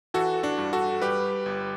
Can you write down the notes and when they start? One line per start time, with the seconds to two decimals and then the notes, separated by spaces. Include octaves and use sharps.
0.14 E3 F#4 A4
0.43 D4 F#4
0.58 G2
0.73 F#4 A4
1.01 G3 G4 B4
1.46 G1